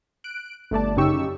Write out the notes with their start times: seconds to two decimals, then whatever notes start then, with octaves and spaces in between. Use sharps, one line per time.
0.24 F#6 D7
0.71 G1 A3 D5 A5
0.96 F#2 C#3 D#4 G4 C#6 E6